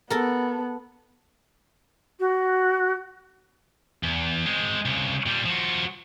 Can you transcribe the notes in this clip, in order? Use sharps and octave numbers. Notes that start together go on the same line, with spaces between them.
B3 A4 A#4
F#4
E2
G#3 C4
C2 C#3
A#2 G3
F3 F#4